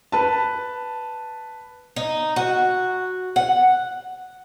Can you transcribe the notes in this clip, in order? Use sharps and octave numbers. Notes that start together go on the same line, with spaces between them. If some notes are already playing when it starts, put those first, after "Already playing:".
B4 A5
D#4
F#4
F#5